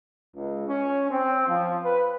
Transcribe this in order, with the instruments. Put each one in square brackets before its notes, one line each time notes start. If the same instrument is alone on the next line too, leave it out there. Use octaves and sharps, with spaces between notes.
[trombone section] C#2
C#4
C4
F3
B4